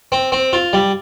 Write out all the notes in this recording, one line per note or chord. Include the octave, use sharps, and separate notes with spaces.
C4
C4
F4
G3